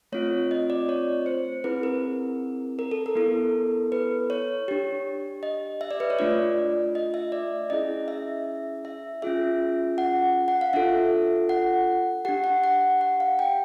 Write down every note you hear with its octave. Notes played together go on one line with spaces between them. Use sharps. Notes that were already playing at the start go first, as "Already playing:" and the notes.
A3 C4 F4 C#5
D#5
D5
C#5
C5
C4 E4 G#4 B4
A#4
A#4
A4
A#4
B3 E4 A4
B4
C#5
D4 G4
D#5
E5
D5
B4
C#5
A3 D4 F4 D5
D#5
E5
D5
C#4 E4 G#4 D#5
E5
E5
C#4 F4 G#4 E5
F#5
F#5
F5
D4 F4 A4 E5
F#5
D4 G4 F#5
F#5
F#5
F#5
F5
G5